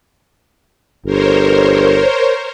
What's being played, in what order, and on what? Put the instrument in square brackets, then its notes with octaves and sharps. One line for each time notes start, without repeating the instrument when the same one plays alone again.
[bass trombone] G1 [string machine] A#4 C5 C#5